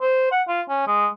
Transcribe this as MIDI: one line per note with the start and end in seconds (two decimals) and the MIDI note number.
0.02 0.28 72
0.32 0.42 78
0.48 0.62 65
0.69 0.84 61
0.87 1.08 56